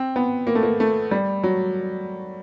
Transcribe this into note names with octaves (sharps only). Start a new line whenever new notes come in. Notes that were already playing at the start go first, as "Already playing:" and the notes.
Already playing: C4
B3
A#3
A3
A#3
A3
G3
F#3